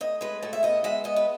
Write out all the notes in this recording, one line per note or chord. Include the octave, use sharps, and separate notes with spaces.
A2 D#5
G#3 B4
A2 A4
E5
B3 D#5
G#3 E5
B3 D#5
B4